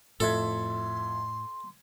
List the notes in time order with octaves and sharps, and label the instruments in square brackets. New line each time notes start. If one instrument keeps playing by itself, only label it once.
[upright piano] F2 E5 G#6 [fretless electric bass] A2 [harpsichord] A4 [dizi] C6